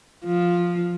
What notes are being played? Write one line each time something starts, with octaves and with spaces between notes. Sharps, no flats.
F3